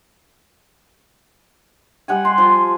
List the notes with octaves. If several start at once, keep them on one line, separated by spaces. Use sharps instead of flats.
G3 F#5 G#5
C6
F3